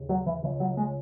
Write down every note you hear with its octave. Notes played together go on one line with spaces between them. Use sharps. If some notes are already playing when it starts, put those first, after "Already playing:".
Already playing: D#2 C#3
F#3
E3
C#2 C#3 E3
F#3
G#3